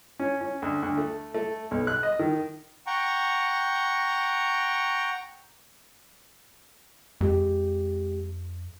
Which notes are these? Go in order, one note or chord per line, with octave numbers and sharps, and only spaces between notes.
C#4
C#4
D2
D2
A3
A3
B1
F#6
D#5
D#3
F#5 G5 A#5 C#6
F2 G#3 G4